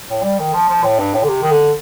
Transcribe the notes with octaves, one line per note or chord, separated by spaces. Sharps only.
A2
G3
D#3
F3
F3
A2
G2
A2
D3
C3
D#3
D3